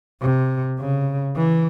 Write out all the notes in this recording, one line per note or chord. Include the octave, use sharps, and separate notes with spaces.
C3
C#3
E3